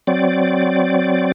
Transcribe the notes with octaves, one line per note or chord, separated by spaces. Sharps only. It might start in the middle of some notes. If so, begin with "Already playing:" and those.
F#3 C4 D5